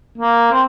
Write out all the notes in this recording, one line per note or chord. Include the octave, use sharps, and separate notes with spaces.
A#3
C4